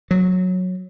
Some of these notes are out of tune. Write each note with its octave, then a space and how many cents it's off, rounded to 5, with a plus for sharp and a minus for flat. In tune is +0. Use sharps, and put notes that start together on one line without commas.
F#3 -15